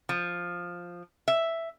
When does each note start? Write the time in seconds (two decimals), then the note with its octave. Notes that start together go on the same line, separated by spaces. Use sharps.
0.09 F3
1.28 E5